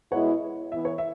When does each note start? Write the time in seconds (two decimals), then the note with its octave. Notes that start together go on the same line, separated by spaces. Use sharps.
0.12 B2 G#3 E4 C#5 F#5
0.72 E3 B3 E4 E5
0.85 C#5
0.98 E5